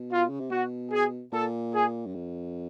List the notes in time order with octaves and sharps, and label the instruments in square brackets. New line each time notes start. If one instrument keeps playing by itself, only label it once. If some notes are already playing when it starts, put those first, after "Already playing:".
Already playing: [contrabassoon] B2
[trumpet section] F4
[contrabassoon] C#3
C3
[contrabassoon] B2 [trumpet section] F#4
[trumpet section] G#4
[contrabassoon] A#2 [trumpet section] A4
[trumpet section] G#4
[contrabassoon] F#2
F2